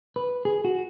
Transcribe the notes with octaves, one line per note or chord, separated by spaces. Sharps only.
B4
G#4
F#4